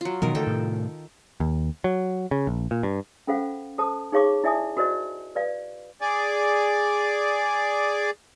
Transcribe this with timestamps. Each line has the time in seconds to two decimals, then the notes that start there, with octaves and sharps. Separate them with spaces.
0.01 F#3 F4
0.22 B2 D#3 E3 F#3 A#4
0.35 D3 G3 A3 A4 G5
0.46 A2 C3
1.40 D#2
1.84 F#3
2.31 C#3
2.47 A#1
2.71 A#2
2.83 G2
3.27 C#4 F4 A4 C5 F5 F#5
3.78 A4 C5 A5 D#6
4.12 D#4 G#4 C#5 F5 C#6 D6
4.44 E4 D5 E5 G#5 A5 D#6
4.77 F#4 A#4 C5 D5 D#5
5.35 B4 D5 F5
6.01 G#4 D5